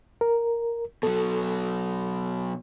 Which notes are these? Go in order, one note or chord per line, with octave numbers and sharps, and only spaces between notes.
A#4
B2 F#3 A4